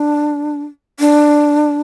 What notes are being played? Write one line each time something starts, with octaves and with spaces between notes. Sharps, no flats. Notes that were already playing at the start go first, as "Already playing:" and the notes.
Already playing: D4
D4